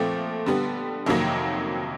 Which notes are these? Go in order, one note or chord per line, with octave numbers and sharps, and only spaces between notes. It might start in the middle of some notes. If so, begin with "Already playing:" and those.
Already playing: A#2 F3 A3 C4
D3 G3 B3
F2 C3 D#3 F#3 A#3